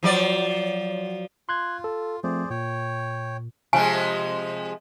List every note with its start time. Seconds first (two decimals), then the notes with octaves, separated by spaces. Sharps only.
0.03 F3 F#3 D5
1.49 F4 C6 F#6 G#6
1.84 A4
2.24 F3 A3 C4 G#4 C5 D5
2.50 A#2 C#5 G5
3.73 C3 F3 G#3 G#5